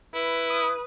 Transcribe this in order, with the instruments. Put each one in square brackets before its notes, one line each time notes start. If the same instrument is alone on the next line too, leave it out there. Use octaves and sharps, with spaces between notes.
[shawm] E4 [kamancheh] B4
[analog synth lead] D#6